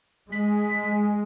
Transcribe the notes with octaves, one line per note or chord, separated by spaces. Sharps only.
G#3 B6